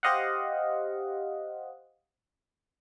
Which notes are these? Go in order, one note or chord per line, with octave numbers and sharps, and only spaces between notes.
G4 C5 D#5 F5 F#5